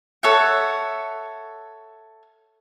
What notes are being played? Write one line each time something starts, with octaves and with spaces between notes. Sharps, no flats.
A4 C#5 E5 F#5